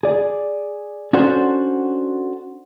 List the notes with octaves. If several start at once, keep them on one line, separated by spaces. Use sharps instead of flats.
G#4 D5
C#4 D4 F#4 A4 C5